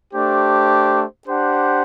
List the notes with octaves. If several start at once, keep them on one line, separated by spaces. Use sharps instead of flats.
A3 D4 G4 C5
D4 G4 C5 F#5